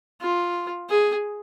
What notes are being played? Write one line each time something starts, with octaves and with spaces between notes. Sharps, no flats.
F4
G#4